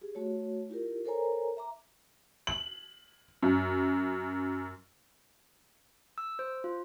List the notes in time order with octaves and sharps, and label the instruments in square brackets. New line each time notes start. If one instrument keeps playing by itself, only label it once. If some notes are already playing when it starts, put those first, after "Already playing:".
[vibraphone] G4 G#4
A3 F#4 C#5
E4 F4 G4 A#4
A4 A#4 C5 C#5 G#5 A#5
E5 A#5 D6
[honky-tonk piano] F#7
F#2
[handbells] E6
C5
F4